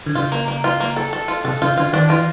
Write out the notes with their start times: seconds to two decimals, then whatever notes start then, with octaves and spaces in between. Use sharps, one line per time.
0.06 D3
0.15 C#3 F4
0.32 A#3
0.48 A#3
0.64 F4
0.80 A#3
0.96 A4
1.13 A4
1.28 F4
1.44 C3 A4
1.62 C#3 F4
1.77 D3 F4
1.93 D#3 D4
2.10 E3 F4